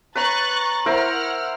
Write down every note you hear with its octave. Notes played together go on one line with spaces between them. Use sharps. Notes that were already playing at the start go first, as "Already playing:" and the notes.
B4 C#5 A#5 C#6 F#6 A6
E4 A#4 C5 F#5 F6